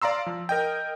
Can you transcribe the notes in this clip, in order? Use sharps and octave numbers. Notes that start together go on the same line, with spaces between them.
D5 F5 A#5 C6 E6
F3
A#4 D#5 G5